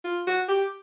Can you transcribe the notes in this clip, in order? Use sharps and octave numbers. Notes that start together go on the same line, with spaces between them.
F4
F#4
G4